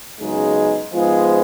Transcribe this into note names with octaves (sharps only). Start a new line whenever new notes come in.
F#2 C#3 G#3 B3 D#4
G#2 F3 G#3 B3 F4